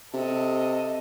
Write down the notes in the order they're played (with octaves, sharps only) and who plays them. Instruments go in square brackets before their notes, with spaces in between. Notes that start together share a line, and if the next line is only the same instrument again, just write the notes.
[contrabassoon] C3 [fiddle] A4 D#5